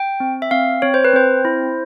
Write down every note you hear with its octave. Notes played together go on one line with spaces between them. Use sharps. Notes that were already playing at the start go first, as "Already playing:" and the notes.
Already playing: G5
C4
E5
C4 F5
C4 C#5
C5
B4
C4 C5
E4